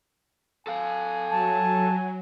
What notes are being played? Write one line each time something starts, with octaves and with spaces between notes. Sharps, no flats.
A4 F5 G#5
F#3 A5